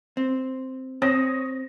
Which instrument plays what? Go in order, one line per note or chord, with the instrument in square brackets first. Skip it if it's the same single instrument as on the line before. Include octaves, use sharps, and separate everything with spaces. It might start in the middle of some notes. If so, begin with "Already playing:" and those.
[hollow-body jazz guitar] C4
[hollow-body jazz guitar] C4 [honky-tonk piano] C#5 D#6 A#6